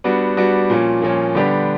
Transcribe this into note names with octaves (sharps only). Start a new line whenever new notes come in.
G3 B3 D4 F#4
G3 B3 D4 F#4
A#2 F3 A#3 C#4
A#2 F3 A#3 C#4
D3 G3 B3 D4 G4